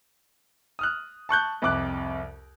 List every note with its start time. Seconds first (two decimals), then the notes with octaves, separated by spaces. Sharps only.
0.79 D#6 F6 F#6
1.29 A5 C#6 F#6 G6
1.62 C2 F2 D6 F#6